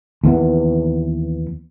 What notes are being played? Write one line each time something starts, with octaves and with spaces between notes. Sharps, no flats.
D#2 E3 B3